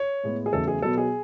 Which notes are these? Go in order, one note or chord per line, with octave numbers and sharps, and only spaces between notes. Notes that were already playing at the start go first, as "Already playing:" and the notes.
Already playing: C#5
A2 G#3 B3
G#4
E2 C#3 F#3 A3 A4
G#4
B2 F#3 B3 A4
G#4